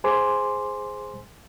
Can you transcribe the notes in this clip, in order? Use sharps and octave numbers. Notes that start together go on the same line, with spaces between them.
G#4 C5 G#5 C6 D6